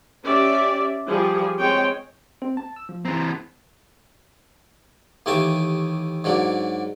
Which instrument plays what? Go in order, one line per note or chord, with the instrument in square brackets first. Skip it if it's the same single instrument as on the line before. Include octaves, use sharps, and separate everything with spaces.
[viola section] C#4 G4 D5 E5
F3 G3 G#4
G#3 C4 C#5 G5
[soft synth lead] C4
A5
E6
F3
[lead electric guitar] E3 C4 [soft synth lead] A#5
[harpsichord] D#2 E3 A3 G4 G#5 A5
G#2 F#3 A#3 D4